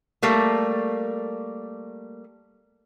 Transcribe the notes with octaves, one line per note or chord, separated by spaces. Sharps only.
G3 A3 A#3